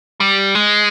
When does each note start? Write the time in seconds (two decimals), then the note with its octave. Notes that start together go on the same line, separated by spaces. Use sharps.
0.20 G3
0.55 G#3